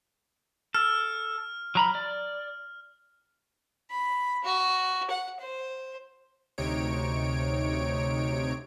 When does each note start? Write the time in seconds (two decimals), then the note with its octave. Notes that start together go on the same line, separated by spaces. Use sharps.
0.74 A4 F6
1.75 F#3 A#5 B5
1.95 D5
3.91 B5
4.44 F#4
5.10 F#5
5.40 C5
6.58 D2 C3 D#4 C#5 D7